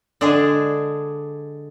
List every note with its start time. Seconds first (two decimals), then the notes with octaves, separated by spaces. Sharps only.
0.21 D3 G#3 D4 G#4